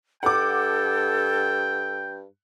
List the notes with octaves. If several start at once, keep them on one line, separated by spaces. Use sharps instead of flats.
G2 A4 F#5 G5 D6